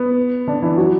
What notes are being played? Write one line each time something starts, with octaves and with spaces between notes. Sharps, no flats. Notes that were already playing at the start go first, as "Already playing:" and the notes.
Already playing: B3
D3 D4
E3 E4
F#3 F#4